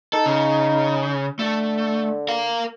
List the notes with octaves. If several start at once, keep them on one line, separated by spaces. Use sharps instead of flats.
D#4 A4
C#3
D3 A3
A#4 F5